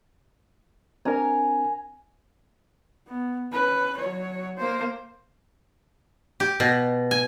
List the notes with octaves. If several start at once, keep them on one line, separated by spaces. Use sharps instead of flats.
C4 D4 A#4 G#5 A#5
B3
C#4 B4
F#3 C#5
A#3 C5
G4
B2
G#5